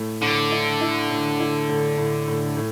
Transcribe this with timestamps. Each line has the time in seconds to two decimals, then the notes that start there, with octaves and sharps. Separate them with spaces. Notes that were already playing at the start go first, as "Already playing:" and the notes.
Already playing: A2 A3
0.22 A2 D3
0.51 E4
0.81 E4
1.10 A2
1.40 E4
1.69 A2
1.97 A2
2.28 A2
2.57 A2